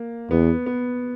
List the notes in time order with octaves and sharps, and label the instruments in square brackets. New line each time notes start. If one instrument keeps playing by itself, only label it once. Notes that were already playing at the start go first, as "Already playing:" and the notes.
Already playing: [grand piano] A#3
[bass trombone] E2 [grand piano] B3
[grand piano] B3